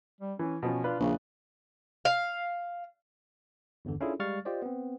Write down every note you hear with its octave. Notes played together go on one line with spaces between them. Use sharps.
G3
E3 C#4
B2 F3 C#4
D4 F4 B4
A#1 C#3
F5
G1 E2 D3
C#4 D4 E4 F4 G#4 A4
G3 G#3 F5 C#6 F6 A6
F4 G4 C5 D5 D#5
B3 C4